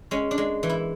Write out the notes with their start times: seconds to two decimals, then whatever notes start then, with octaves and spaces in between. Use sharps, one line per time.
0.11 G#3 C#4
0.31 D4
0.38 G#3
0.63 E3
0.70 E4